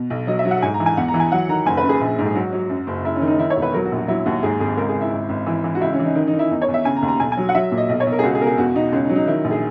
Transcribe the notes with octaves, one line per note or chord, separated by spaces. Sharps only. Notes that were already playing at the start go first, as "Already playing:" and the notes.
Already playing: B2
B1
F#3 D#5
E5
F#3
F#5
G#2 G#5
A#5
E3
G#5
E2 F#5
A#5
E3
G#5
F#3 F#5
D#3 A#5
F#1 G#5
B4
F#2
G#4
A#1
G#2
G#4
F#3 F#4
F#3
F#2
F#1
F#1 E4
C#4
D#3
D#4
D#3 E4
C#5
E1
B4
F#3 A#4
F#4
A#1
F#4
F#3 E4
D#2 F#4
G#2 G#4
G#1 G#4
C#2 A#4
G#4
C#2
E4
G#1
G#1
E3
E3
F#4
C#2 E4
C#4
E3
D#4
D#3 C#4
D#4
D#3
E4
E2 D#4
C#5
E2
E5
C#3 G#5
A#5
D#2
A#5
B1 G#5
G#5
F#3
F#5
F#3 E5
A#2
D#5
B1 D#5
C#5
B1
A#4
G#4
C#2 F#4
G#4
B2 A#4
G#4
E2 F#4
B2 D#4
C#2 C#4
D#4
F#3
D#4
D#3 E4
A#1
G#4